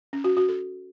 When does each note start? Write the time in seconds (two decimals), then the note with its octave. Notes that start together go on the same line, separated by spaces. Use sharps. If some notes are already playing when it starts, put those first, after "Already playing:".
0.13 C#4
0.24 F#4
0.37 F#4
0.49 A4